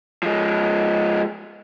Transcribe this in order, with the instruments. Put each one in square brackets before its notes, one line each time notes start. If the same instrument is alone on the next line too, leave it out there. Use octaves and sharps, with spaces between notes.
[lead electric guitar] F3 G#3